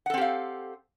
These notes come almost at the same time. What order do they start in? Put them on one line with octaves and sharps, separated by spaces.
F#5 A4 C4 G4 F5